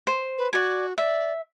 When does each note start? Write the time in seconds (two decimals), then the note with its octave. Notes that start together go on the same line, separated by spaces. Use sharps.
0.07 C5
0.38 B4
0.53 F#4 D5 G#5
0.98 D5 E5